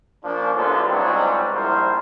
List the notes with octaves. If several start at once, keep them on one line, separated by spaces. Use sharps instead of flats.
F3 A#3 C#4 D4
A1 D3 F3 A#3 B3 C5
C#2 G#2 C3 F#3 G3
A#1 G3 E4 A#4 C5